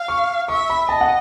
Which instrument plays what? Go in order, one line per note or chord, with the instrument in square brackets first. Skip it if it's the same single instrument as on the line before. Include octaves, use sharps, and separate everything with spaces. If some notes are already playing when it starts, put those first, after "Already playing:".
Already playing: [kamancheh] F5
[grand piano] C#6
[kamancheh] E5 [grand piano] C#6
[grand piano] B5
[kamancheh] D#5 [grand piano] A5
[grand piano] F#5